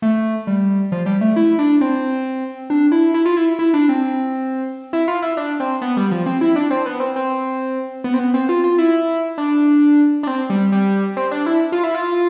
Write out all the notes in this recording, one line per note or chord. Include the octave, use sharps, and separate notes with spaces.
A3
G3
F3
G3
A3
E4
D4
C4
D4
E4
E4
F4
E4
E4
D4
C4
E4
F4
E4
D4
C4
B3
G3
F3
C4
E4
D4
C4
B3
C4
C4
B3
C4
B3
C4
F4
F4
E4
D4
D4
C4
G3
G3
C4
D4
E4
F4
E4
F4